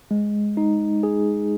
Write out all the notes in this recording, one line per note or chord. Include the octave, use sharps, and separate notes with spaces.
G#3
D#4
G#4